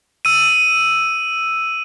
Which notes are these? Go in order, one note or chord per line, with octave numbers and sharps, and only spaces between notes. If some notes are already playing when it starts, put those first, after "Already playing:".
E6 D#7